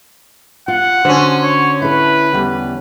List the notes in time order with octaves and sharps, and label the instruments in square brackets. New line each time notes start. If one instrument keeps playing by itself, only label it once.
[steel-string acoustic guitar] F4 [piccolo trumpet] F#5
[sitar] D3 C#4 [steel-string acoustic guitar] F#4 C5
[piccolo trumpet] C#5
[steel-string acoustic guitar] E4 A4 [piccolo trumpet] B4
[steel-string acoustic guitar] E2 G3